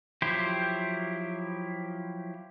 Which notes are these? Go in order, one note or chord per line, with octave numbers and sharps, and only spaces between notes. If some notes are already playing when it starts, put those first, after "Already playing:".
F3 F#3 E4 G4 C5